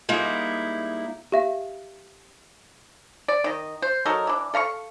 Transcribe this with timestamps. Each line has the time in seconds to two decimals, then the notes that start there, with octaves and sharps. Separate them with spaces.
0.09 G3 G#3 A#3 D#4 E4
1.32 G4 E5 F5
3.28 D5
3.44 D#3 D#5
3.82 C5
4.06 F#3 D#4 A4 A#4
4.27 E3 D4
4.54 A4 F5 A#5 C#6